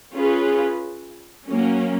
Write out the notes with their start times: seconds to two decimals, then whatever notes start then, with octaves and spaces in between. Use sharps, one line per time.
0.13 C#4 F4 G#4 B4
1.47 F#3 A#3 C#4